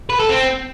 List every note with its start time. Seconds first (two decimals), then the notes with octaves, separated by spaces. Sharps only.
0.10 B4
0.19 A4
0.29 C4